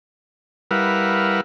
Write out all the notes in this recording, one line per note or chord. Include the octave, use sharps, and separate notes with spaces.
G3 E4 A#4 B4 F5 F#5